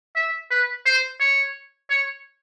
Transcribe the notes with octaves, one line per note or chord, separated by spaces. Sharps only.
E5
B4
C5
C#5
C#5